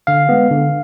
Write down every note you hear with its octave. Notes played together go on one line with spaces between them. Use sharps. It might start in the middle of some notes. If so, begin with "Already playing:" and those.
D3 F5
G#3 B3
D3